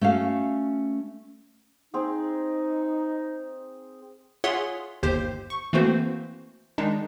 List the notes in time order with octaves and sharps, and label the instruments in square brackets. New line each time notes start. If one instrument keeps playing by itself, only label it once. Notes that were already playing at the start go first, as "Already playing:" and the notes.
[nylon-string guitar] A3 C#4 F#4 F5
[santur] C4 G#4 [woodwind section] D#4
[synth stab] F4 G#4 C#5 E5 F#5 C6
G1 D#2 G4 C5 G6
C#6
E3 A3 A#3 C4 F#4 C5
D#3 G#3 D4 D#4